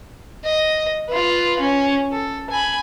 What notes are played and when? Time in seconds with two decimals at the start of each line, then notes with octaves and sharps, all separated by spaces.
0.44 D#5
1.09 F4 B4
1.60 C#4
2.12 A4
2.50 G#5 B5